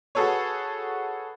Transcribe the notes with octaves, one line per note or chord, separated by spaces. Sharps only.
F#4 G#4 A4 B4 C#5